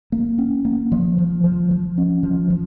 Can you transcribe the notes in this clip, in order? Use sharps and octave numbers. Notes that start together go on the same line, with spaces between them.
A#3
C#4
A#3
F3
F3
F3
F3
C#4
F3
F3